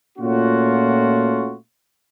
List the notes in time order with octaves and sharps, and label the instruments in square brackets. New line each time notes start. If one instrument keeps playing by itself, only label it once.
[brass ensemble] A#2 A3 C#4 F4 F#4